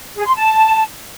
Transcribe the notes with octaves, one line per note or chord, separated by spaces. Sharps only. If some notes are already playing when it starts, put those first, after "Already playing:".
G#4
C6
A5